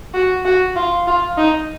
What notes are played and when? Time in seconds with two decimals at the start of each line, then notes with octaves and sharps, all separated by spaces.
0.14 F#4
0.45 F#4
0.76 F4
1.07 F4
1.37 D#4